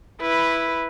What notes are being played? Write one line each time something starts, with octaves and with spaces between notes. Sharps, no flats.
E4 B4